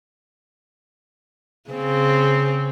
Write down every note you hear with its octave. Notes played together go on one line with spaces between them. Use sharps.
C#3 C4